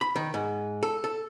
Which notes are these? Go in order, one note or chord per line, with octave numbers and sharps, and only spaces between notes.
B5
D#3
G#2
A4
A4